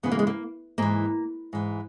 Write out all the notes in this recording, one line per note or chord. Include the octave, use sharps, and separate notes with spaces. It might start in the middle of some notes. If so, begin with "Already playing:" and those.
D#2 C#3 E3 B3
A#3
G#3
A#3
G#2 E3 A#3
G#2 E3